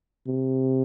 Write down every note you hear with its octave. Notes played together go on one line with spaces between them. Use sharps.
C3